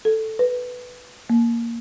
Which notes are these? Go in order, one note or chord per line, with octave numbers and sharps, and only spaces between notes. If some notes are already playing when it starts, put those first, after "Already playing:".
A4
B4
A#3